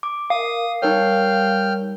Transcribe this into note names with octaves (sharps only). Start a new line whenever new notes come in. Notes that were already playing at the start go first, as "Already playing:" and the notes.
D6
A#4 F5 D#6
G3 D#4 A#4 C#5 G5 F6